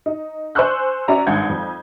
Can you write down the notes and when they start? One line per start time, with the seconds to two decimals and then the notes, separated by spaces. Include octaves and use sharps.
0.06 D#4
0.55 C5 G#5 C#6 E6 F#6 G6
1.08 C#4 F#4 D5 E5 A#5
1.27 G#1 G2 F#5 G6 G#6
1.49 F2